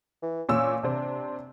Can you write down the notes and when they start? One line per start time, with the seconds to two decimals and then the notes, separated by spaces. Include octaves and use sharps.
0.22 E3
0.49 A#2 C#4 E6
0.83 C3 C4 D4